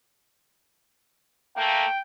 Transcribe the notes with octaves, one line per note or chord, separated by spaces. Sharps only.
A3 A#3 G5